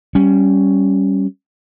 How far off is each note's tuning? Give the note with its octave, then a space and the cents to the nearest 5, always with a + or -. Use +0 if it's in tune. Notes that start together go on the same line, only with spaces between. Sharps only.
G3 -10 C#4 +0